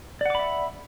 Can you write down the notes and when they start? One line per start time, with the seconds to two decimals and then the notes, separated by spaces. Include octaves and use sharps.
0.21 D5
0.26 F#5
0.30 D6
0.35 B5
0.39 E5